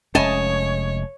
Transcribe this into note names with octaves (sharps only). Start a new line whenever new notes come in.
F1 G#3 C#4 C#5 D#5 G#5 A5